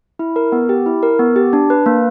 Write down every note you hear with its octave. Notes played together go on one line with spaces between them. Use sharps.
E4
A#4
B3
G4
E4
A#4
B3
G4
D4
B4
A#3